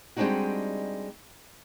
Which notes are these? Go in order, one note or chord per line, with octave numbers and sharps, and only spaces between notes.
G3 G#3 C4 D4 D#4 F#4